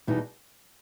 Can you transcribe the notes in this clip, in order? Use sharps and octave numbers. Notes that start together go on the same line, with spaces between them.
E2 B2 G3 D#4